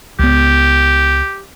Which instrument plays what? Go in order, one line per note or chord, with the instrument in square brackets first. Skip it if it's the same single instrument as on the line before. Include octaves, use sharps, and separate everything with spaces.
[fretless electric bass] C#2 B3 [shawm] G4